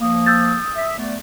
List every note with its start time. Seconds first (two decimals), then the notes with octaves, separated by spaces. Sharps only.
0.01 F3 A#3 D#6
0.26 E6 G6 A6
0.76 E5
0.98 A3 B3 D5